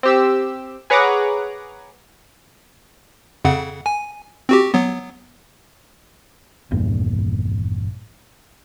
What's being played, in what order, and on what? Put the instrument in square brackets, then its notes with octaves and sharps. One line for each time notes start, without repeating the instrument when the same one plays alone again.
[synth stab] C4 G4 E6
G#4 B4 C#5 F#5 A#5 D6
[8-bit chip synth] F2 C#3 F#5
G#5
C4 F#4 G4
F#3 B3
[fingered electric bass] G#1 E2 G2 A#2